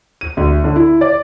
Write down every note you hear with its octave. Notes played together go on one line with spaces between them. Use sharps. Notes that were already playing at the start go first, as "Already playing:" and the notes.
D#7
D2
D3
E4
D5